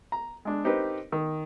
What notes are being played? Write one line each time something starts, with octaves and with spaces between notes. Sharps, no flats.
A#5
G#3 D4
C4 D#4 G4 A#4 B4
D#3